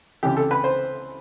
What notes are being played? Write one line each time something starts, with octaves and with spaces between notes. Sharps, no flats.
C#2 C3 E3 G4
A4
B4
C5